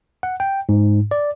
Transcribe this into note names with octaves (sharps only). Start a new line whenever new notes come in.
F#5
G5
G#2
D5